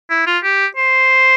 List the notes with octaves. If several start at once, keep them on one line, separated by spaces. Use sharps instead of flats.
E4
F4
G4
C5